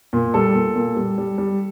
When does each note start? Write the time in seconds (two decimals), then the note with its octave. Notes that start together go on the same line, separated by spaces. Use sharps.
0.13 A#2
0.34 G3 A4
0.54 A#2
0.76 A#2
0.96 G3
1.18 G3
1.38 G3